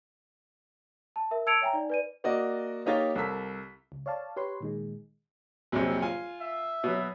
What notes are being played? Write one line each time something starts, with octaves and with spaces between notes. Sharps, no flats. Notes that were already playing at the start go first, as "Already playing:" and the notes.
A5
A#4 E5
A5 E6 G#6 C#7 D7 F7
C#5 E5 G5 G#5 A#5
D#4 D5 G#5
B4 D5 D#7
A#3 F#4 D5 D#5
A#3 D#4 G4 C#5 F5 A6
C2 A4 A#4 E6 B6
C#2
C#5 D5 F5 A5
G4 B4 C#5 C6
A#2 D#3 G#3
A#1 F2 C3 F#3
F4 G#5
E5
B2 F#3